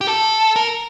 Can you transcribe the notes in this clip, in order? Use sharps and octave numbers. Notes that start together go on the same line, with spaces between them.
G4
A4
A#4